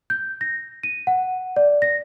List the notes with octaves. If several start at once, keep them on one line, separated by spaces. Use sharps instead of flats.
G6
A#6
D#7
F#5
D5
A#6